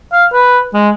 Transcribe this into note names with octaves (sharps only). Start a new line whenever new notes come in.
F5
B4
G#3